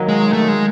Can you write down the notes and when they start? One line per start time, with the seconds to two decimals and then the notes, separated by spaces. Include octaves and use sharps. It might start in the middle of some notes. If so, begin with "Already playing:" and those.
Already playing: D#3 F#3 A#3 D#4
0.08 G#3
0.33 A3
0.48 G#3